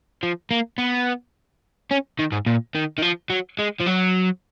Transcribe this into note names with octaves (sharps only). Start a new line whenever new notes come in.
F3
A#3
B3
C#4
D#3
G#2
A#2
D#3
D#3
F3
F#3
G#3
F3
F#3